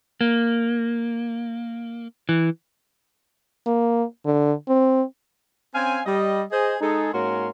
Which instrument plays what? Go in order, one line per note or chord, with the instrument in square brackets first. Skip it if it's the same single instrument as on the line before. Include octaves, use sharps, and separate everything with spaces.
[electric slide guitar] A#3
E3
[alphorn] A#3
D3
C4
[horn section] C4 C#4 F5 G#5
G3 D#5
G#4 C5 D#5
G#3 D#4 G#4 A4
G#2 A#3 C#4 F#4 A#4 C6